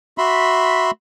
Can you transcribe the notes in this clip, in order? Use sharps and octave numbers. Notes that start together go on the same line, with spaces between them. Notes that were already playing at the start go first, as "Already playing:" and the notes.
F#4 E5 B5 C6